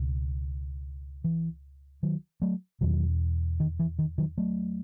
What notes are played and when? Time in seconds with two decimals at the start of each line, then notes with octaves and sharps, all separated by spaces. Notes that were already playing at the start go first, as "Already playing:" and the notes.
Already playing: C#2 B2
1.24 E3
2.03 D#3 F#3
2.42 F#3 A3
2.81 E2 B2 D#3 F#3
3.60 D#3
3.80 E3
3.99 D#3
4.18 D#3 F#3
4.38 F#3 A3